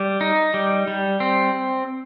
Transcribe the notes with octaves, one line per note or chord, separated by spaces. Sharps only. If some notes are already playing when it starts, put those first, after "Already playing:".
Already playing: G3
D#4
G3
G3
C4